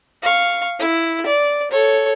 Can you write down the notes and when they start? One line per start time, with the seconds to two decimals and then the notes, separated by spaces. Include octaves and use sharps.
0.23 F5 C#6
0.79 E4
1.26 D5
1.71 A4 C#5